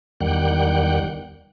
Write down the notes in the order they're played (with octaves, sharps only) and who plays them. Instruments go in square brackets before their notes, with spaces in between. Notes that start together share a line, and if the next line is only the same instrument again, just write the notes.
[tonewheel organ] E2 D#3 G3 F#5 G5